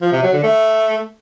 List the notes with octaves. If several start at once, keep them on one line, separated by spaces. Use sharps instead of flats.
F3
C3
F#3
D3
A3